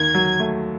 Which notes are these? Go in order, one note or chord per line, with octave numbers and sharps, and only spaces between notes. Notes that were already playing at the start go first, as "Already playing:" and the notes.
Already playing: D#2 D#3 G#6
F#3
A3